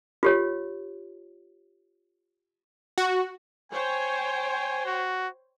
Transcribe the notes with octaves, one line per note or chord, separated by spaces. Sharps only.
F4 G4 C#5
F#4
C5 C#5 G5 G#5
F#4